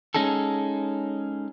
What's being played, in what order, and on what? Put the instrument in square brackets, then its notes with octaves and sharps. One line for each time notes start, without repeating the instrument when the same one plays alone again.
[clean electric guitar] G#3 C#4 D#4 G#4 A4